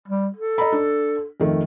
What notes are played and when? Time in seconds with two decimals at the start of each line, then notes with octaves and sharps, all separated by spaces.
0.08 G3
0.37 A4
0.58 D#5 A#5 B5
0.72 D4
1.40 F2 D#3 A3